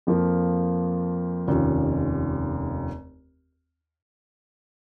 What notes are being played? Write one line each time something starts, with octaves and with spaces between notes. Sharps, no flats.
F2 F3 A#3
F1 D#2 D#3 C#4 F4